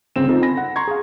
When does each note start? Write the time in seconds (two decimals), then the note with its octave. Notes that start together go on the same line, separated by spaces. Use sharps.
0.16 G1 C#3 C4 E7
0.29 C4 D#4 F4 A4
0.42 G#5 B5 A#6
0.57 F#5
0.76 A#5 C6 C#6 G#6
0.88 G#4 F5